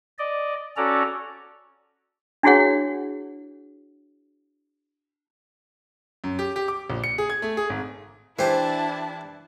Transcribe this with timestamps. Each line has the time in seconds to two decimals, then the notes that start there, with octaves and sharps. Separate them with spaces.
0.19 D5 D#5
0.77 C#4 F#4 A4 D5 A#5
2.43 D4 E4 F#4 G#4 C#5 F#5
6.24 F#2
6.39 G4
6.56 G4
6.68 D6
6.90 A#1
7.04 C#7
7.18 G#4
7.30 G#6
7.42 A3
7.57 G#4
7.70 G#1
8.39 E3 D4 E4 G4 C5 A5